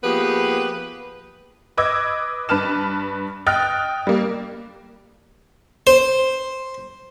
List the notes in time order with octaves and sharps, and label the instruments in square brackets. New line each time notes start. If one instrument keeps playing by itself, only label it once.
[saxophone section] F3 A#3 B3 G4 G#4 B4
[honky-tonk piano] B4 D#5 D6 E6 G#6
G2 B4 A5 F6 E7
D#5 G5 D#6 F6 F#6 A6
G3 A#3
[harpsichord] C5